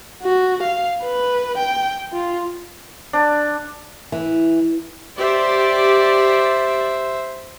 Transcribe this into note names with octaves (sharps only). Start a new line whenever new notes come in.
F#4
F5
B4
G5
F4
D4
E3
G4 C5 D5 E5